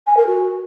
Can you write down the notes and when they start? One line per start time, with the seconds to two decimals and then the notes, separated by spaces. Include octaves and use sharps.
0.07 G#5
0.17 A#4
0.27 F#4